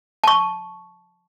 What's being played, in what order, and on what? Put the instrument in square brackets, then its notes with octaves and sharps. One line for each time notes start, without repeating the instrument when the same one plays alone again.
[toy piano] A5 C#6